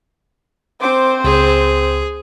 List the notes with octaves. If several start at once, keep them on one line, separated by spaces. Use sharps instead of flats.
C4 C5 D6
C#2 G#4